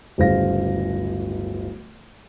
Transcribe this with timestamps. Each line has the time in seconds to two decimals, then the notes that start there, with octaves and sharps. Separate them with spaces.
0.18 D1 G1 C#3 C5 F5 A#6